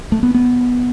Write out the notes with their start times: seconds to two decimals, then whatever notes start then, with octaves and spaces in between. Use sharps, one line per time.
0.12 A3
0.23 B3
0.34 B3